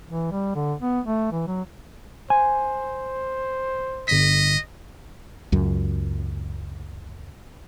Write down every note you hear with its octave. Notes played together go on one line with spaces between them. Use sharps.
E3
G3
D3
B3
A3
E3
F#3
C5 G#5
G1 D#5 B6
C#2 F#2